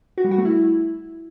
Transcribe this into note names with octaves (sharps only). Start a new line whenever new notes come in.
F#4
G3
F#4
A3
E4